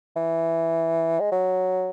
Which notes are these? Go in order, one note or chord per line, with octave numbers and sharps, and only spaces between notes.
E3
G#3
F#3